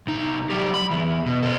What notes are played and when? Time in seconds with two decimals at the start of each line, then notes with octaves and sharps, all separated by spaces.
0.07 C2 D#4
0.50 F#3 G4
0.74 B5
0.91 E2 E3
1.26 B2
1.42 A4 C5